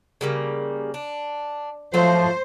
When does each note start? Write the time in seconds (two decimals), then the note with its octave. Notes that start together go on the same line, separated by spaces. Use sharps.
0.21 C#3 G3 A#3
0.94 D4
1.94 F3 F#3 A3 C5